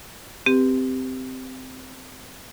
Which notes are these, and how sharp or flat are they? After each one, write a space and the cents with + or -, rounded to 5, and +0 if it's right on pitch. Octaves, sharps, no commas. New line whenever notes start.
C4 -15 G4 +0 B4 -20